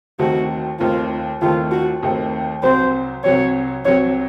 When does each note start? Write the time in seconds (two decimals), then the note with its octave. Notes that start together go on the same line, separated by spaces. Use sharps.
0.19 D#2 D#3 A3 C4 F#4
0.80 D#2 D#3 A3 C4 F4
1.41 D#2 D#3 A3 C4 F4
1.72 F#4
2.03 D#2 D#3 A3 C4
2.63 C2 C3 F#3 C4 C5
3.24 C2 C3 F#3 C4 C#5
3.85 C2 C3 F#3 C4 C#5